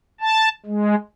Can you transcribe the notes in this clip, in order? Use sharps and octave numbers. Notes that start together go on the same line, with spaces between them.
A5
G#3